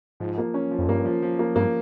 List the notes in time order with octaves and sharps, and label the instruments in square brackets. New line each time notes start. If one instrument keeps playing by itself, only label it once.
[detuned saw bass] G#2 [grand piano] F3
[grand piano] A#3
C#4
F3
[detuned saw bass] F2
[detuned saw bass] G2 [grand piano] A#3
[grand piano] F3
F3
A#3
[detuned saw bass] G2 [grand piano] A#3